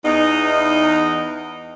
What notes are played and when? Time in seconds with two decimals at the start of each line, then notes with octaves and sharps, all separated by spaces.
0.05 E2 D#4